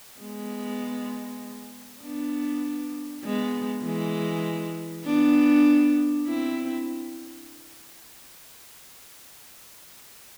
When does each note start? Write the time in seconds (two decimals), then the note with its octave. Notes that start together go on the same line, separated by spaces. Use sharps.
0.20 G#3 B3
2.02 B3 D4
3.23 G#3 B3
3.84 E3 G#3
5.05 B3 D4
6.27 C4 E4